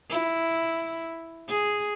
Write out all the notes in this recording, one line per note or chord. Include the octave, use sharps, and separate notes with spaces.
E4
G#4